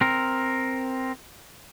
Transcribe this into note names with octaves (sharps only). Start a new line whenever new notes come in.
C4 A#4